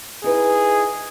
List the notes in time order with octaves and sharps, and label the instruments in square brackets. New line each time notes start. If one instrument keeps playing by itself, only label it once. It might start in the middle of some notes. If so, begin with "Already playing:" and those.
[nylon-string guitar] D#4 E4 B4 [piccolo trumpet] G#4